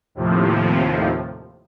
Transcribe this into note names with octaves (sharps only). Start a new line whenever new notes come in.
D#2 A2 C3 F3